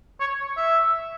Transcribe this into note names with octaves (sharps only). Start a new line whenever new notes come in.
C#5
E5